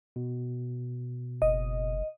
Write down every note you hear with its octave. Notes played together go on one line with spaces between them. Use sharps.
B2
F#1 D#5